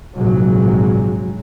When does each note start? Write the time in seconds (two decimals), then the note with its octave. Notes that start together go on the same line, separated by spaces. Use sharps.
0.16 A#1 G#2 C3 F#3 G#3